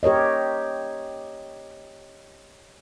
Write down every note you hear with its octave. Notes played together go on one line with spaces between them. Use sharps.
G4 A#4 C#5 D#5